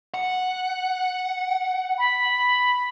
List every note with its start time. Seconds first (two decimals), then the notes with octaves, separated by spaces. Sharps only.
0.14 F#5
1.98 B5